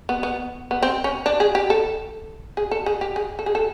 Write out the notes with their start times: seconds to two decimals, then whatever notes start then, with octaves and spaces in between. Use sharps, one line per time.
0.09 B3
0.23 B3
0.71 B3
0.83 C4
1.04 C#4
1.26 D4
1.40 G#4
1.55 G4
1.70 A4
2.57 G#4
2.71 A4
2.86 G#4
3.01 G4
3.16 G#4
3.39 A4
3.46 G#4
3.55 A4